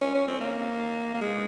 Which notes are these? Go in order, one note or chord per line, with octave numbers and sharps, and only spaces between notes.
C#4
C#4
C4
A#3
A#3
G#3